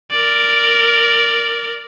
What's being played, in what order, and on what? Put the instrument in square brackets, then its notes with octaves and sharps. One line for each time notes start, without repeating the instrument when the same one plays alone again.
[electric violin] A#4 D5